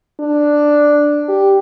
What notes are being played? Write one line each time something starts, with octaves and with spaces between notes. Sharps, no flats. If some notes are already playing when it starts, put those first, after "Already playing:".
D4
G4